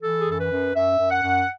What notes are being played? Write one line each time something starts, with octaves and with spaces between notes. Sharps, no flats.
E3 A4
G#4
F#2 A4
B4
F#2
F#2 E5
F#2
F#5
F#2